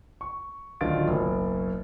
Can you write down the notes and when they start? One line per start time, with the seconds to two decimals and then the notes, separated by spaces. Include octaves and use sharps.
0.21 C#6
0.81 D1 D3 D#3 F4 A6 D7
1.08 F#1 B1